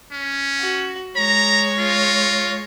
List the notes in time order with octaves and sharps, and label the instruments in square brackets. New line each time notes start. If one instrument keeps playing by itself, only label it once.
[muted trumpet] C#4
[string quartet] F#4
[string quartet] G#3 C#5 A#6 [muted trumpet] A#5
[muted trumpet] F4